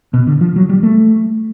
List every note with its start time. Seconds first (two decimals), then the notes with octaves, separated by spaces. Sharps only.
0.14 B2
0.27 D3
0.41 F3
0.56 F#3
0.69 G3
0.83 A3